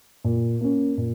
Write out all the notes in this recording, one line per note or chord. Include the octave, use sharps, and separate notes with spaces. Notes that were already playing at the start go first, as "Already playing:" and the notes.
A#2
A#3 C#4
A#2